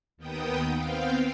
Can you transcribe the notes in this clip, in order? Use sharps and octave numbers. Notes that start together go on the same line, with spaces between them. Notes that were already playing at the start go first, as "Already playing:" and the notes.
D#2 D#3 B3 G5 D#6
B3 C4 F5 G5